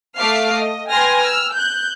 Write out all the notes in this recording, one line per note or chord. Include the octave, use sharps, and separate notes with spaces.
A3 E5 F5 D6 F6 C7
D#5
B4 G5 G#5 C6 F6 A#6
E6 F6
F#6 G6